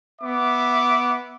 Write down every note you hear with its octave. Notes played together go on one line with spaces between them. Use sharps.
B3 E5 D6